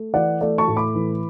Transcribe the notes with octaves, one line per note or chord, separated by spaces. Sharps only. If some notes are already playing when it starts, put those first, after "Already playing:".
Already playing: A3
E3 D5 F#5
A3 D5
A5 C#6
A2
B5 D6
E3